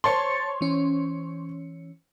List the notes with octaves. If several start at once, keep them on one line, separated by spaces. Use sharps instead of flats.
C5 C#5 A5 C6 A6 C#7
E3 C#4